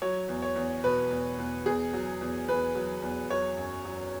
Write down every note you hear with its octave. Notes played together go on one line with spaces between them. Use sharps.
F#3 C#5
E2
C#5
E2
B2 B4
E2
E2
E2 G#4
F#3
E2
E2 B4
F#3
E2
F#3 C#5
F#2
F#3